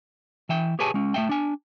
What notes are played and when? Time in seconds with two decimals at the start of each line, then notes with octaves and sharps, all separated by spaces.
0.49 E3 E5 G5
0.79 G4 G#4 B4 C#5 G#5 A5
0.94 G#3 C#4
1.14 A3 E5 G5
1.29 D4 G#5